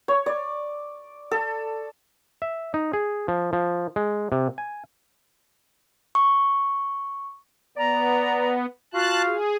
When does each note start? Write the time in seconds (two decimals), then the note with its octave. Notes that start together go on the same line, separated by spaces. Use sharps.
0.08 C#5
0.26 D5
1.31 A4
2.42 E5
2.74 D#4
2.93 G#4
3.28 F3
3.53 F3
3.96 G#3
4.32 C3
4.58 G#5
6.15 C#6
7.77 B3 D5 A#5
8.94 F4 F#4 F5 A5 F#6
9.25 G#4